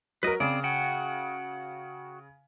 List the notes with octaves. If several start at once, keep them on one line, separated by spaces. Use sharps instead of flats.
F#3 A#4 B4 D#5
C#3 C4 D5
F#4 F#5 G5